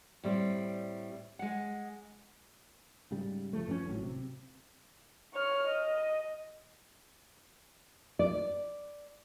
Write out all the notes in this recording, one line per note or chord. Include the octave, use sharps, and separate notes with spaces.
A2 G3 C4
G#3 F#5
G#2 C#3 G3
G#1 F3 A3
G2 F3 A#3 C#4
G#1 A2 F#3
C3
C#5 F6
D#5
D5